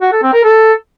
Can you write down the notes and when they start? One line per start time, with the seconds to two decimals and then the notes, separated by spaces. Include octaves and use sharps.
0.01 F#4
0.12 A4
0.23 C4
0.33 A#4
0.44 A4